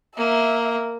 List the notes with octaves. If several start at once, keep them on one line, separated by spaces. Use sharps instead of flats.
A#3 E5